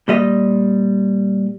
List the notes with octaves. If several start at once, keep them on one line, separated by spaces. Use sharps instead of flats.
A#2 G3 D#5